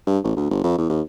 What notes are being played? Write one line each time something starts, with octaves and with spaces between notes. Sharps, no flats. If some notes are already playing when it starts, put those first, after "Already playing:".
G2
A1
D2
G1
F2
E2
D#2